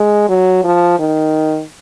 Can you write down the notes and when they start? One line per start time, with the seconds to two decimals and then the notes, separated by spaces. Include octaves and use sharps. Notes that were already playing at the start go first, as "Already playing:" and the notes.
Already playing: G#3
0.29 F#3
0.64 F3
0.99 D#3